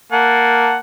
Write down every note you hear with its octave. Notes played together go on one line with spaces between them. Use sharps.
A#3 F#5 A5